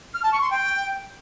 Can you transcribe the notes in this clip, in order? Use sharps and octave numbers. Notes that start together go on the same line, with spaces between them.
F6
A5
C#6
C6
G5